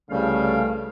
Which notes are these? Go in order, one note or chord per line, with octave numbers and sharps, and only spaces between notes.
C2 G2 C#3 G3 A3 F5